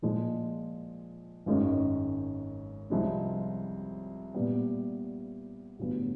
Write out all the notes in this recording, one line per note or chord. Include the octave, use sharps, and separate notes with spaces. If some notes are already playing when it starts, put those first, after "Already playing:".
A#2 F3 G#3
G#1 F#2 D#3 G#3 C#4
C2 C3 F3 G#3 C4
A#2 G3 B3
A1 G2 D3 F#3 B3